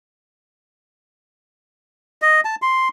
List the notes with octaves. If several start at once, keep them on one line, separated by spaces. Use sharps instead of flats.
D#5
A5
C6